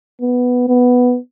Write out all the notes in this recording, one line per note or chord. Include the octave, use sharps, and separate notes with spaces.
B3
B3